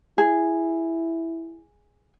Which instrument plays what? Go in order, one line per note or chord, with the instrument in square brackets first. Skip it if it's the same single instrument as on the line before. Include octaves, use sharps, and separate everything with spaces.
[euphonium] E4 [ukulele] G#4